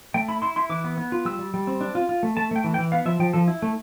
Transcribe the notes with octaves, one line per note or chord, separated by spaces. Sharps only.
A3 G5
E4 B5
E4 C6
E4 C6
E3 D6
B3
B3
F4
G3 E6
G3
G3
C4
D4
F4
F4
A3
A3 A5
A3 G5
E3
G5
E3
B3 F5
F3 E5
F3 G5
F3 A4
E4
A3